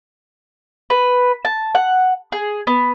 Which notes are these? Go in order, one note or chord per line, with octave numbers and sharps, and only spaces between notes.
B4
A5
F#5
G#4
B3